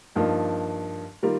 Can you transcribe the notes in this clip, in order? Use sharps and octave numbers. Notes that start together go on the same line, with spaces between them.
G2 F3 A#3 D#4
D#3 G3 A#3 F4 A#4